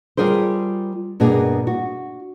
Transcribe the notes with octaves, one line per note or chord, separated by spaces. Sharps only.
G3 F4 G#4 A#4 C5
G2 B2 A#3 D4 G#4
F#4